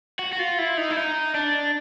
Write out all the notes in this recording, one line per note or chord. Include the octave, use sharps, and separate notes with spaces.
F#4
F#4
F4
E4
D#4
E4
D#4
D4